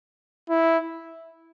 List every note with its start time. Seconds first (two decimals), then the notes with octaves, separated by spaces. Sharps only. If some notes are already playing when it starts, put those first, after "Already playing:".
0.49 E4